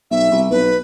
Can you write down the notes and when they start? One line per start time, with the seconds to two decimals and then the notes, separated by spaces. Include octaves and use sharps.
0.11 B1 E5
0.32 C2
0.51 B1 B4